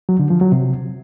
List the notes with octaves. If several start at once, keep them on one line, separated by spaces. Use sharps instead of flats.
F#3
D3
F3
F#3
C3